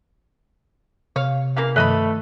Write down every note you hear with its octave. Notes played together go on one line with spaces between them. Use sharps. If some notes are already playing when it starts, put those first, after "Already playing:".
C3 C#5 F5
C#3 E3 A#3 F5
G2 D#3 F3 A3 B4 D#5 B5